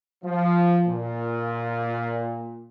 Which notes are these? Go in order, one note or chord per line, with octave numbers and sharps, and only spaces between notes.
F3
A#2